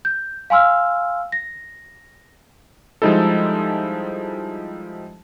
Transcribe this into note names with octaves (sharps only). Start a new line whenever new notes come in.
G6
F5 G#5 C6 E6 F6
A#6
F3 G3 G#3 D#4 E4 A4